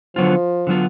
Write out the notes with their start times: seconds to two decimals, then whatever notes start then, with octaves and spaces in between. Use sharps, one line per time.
0.16 D3 F3 F#3 B3 F4
0.67 D3 F#3 B3 F4